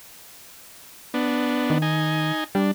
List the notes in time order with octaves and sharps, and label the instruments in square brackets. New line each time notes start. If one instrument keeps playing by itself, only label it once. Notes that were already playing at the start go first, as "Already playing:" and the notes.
[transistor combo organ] B3 D4
[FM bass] D#3
[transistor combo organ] D#4 G#5
[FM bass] G3 [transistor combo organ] D4